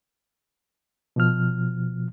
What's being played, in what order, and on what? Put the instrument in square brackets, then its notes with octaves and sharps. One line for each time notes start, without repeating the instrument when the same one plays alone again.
[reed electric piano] B2 F3 F6